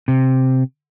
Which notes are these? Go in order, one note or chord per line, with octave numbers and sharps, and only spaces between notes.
C3